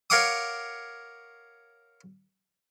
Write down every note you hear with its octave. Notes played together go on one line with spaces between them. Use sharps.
A#4 C#5 F5 F#5 D6 D#6